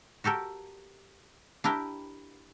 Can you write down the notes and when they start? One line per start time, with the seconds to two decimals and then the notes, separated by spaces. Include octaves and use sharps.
0.24 F#4 G4 A4 A#4
1.64 D4 E4 G4 A#4 G5